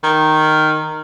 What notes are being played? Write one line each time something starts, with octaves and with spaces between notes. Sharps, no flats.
D#3